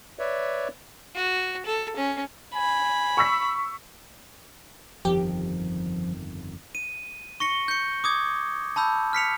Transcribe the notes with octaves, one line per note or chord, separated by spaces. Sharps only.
B4 C#5 D5 E5
F#4
A4
C#4
G#5 B5
C#6 E6 B6
G1 F2 D#3 F3 G4
D#7
C#6 A#6 C#7 G7
G6 C#7
D6 D#6 G#6
A5 B5 E6 G6
F6 B6 C#7 F7